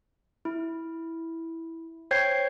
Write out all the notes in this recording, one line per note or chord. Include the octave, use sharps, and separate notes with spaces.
E4
C5 C#5 G5 G6 G#6 C7